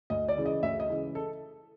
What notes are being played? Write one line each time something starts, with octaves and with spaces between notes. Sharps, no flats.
D2 D#5
D5
C#3 E3 G#3
D#5
D2 E5
D#5
C#3 E3 G#3
A4